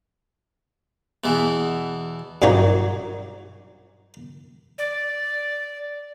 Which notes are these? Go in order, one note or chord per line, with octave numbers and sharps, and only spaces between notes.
E2 B2 E3
G2 A#2 F#3 D#4 C#5
D5